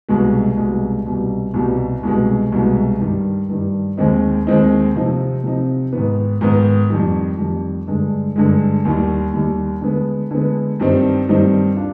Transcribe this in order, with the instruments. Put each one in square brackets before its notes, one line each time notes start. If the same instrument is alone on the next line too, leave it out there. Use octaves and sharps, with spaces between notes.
[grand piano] C2 B2 G#3
C2 B2 G#3
C2 B2 G3
C2 B2 G3
C2 B2 G#3
C2 B2 G#3
G2 D#3 G3
G2 D#3 G3
D#2 D#3 G#3 C4 D#4
D#2 D#3 G#3 C4 D#4
C3 F3 C4 D#4
C3 F3 C4 D#4
G#2 D#3 B3
G#2 D#3 B3
F2 D#3 G3
F2 D#3 G3
G2 D3 G#3
G2 D3 G#3
D#2 D#3 G3
D#2 D#3 G3
D3 G#3 B3
D3 G#3 B3
G2 D#3 G3 C4 D#4
G2 D#3 G3 C4 D#4
D4 F4